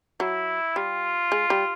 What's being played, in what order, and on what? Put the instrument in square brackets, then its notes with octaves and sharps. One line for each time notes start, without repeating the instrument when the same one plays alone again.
[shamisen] F#3 [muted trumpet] E4
[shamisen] G3 [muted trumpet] F4
[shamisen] G#3
G3